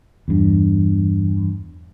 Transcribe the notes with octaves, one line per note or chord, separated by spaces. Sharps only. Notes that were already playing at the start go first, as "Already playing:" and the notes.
E2 G2